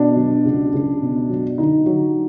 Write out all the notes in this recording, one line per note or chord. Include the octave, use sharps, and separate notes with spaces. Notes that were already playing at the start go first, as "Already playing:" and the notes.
Already playing: B2 D4
F#3
C#2
C#2
B2
F#3
D3 D#4
F#3